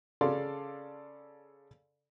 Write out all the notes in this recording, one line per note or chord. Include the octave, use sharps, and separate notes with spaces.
C#3 A4 D5 F5 C6